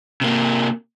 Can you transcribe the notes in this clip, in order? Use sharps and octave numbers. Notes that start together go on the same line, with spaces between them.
C3 A#3